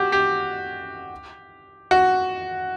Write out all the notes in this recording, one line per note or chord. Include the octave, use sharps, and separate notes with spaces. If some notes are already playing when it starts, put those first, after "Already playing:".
Already playing: F#4 G4
G4
F#4